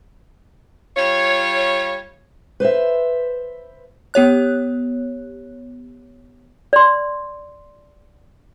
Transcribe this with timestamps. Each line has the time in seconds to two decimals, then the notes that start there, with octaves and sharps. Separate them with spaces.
0.97 G3 F4 C#5
2.60 B4 C5 D#5 E5
4.14 B3 G4 C#5 F#6
6.73 D5 C6